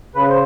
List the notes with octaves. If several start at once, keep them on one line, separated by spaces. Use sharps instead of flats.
C#3 B4
C5